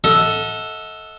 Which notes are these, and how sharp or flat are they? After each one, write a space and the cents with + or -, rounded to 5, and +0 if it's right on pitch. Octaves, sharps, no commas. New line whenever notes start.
A4 +0 D#5 +35 F#5 -30